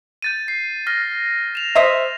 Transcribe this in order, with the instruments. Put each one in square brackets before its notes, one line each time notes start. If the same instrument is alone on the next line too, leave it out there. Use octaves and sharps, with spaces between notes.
[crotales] G6 A6 D#7
C7
F6 A#6
E7 F7
[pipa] C5 D#5 E5